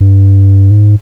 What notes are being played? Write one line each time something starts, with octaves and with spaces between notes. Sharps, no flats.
G2
G#2